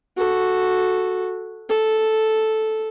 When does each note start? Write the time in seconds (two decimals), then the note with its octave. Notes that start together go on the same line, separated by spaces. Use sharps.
0.17 F#4 A4
1.69 A4